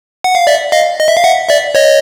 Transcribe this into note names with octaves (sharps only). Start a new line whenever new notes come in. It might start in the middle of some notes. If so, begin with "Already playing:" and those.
F#5
F5
D5 E5
D#5 F5
D#5
E5
F5
E5 F#5
D5 E5
C#5 D#5